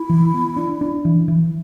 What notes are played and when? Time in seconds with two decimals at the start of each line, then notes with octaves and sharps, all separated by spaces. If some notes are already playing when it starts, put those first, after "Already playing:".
Already playing: E4
0.09 E3
0.34 B3
0.56 D4
0.81 D4
1.05 E3
1.28 E3